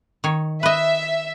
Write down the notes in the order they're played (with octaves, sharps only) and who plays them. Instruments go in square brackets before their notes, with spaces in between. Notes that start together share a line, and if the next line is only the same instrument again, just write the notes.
[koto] D#3 C#5
[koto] B4 D#5 [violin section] E5